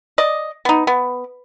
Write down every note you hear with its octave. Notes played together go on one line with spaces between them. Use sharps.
D5 D#5
B3 D#4
B3